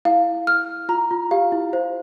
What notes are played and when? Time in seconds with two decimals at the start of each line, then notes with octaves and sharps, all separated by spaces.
0.05 E4 F5
0.47 F6
0.89 F4 A#5
1.11 F4
1.31 G4 F5
1.52 E4
1.73 C5 F5